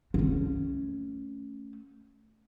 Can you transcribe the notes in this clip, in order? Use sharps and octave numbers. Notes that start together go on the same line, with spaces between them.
A3 C#4